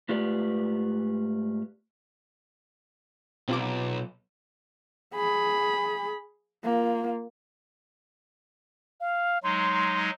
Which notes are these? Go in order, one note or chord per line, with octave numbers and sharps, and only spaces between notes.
G#2 A3 F4 G4 B4 D5
B1 C3 F4 D6
G#4 B5
A#3 F4
F5
F#3 G#3 D#4 C6